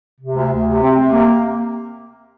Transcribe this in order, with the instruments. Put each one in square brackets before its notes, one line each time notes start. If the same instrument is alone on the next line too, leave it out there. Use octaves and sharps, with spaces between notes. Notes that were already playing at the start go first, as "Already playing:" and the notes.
[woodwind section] C3
D2
D2
C3
C4
C3
A#3